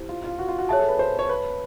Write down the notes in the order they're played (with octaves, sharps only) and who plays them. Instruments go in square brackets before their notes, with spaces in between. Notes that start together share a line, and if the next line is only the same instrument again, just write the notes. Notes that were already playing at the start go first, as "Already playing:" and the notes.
Already playing: [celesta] E4 G4 C5
[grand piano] F4
F4
F#4
F4
F#4
[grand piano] G#4 [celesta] C#5 E5 A5
[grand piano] A4
B4
C5
C#5
B4